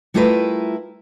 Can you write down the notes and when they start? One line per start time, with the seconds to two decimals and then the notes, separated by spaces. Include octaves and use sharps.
0.14 G3 A3 E4 F4 A#4 B4